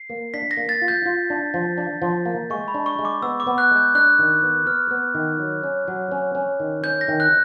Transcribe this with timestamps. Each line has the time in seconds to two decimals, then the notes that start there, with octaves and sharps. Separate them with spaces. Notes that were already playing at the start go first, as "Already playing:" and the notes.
Already playing: C7
0.10 A#3
0.34 D4 B6
0.51 A#6
0.57 A#3
0.69 A6
0.82 F4
0.88 G6
1.06 F4
1.30 D4
1.54 F3
1.78 D4
2.02 F3
2.26 A#3
2.50 G#3 C#6
2.68 B5
2.74 D4
2.86 C#6
2.99 G#3
3.05 D6
3.22 B3 E6
3.40 D6
3.47 B3
3.58 F#6
3.71 G#3
3.76 G6
3.95 D4 F#6
4.19 D#3
4.43 B3
4.67 B3 F6
4.91 B3
5.14 D#3
5.39 F#3
5.64 C#4
5.88 F#3
6.11 C#4
6.35 C#4
6.60 D#3
6.84 C#4 G6
7.01 A#6
7.08 D#3
7.20 F#6